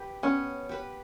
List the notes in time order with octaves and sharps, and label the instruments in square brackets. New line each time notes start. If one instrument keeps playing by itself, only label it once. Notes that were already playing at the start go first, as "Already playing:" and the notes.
Already playing: [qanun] G4 B4
[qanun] B3 [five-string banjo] C#4
[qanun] G4 B4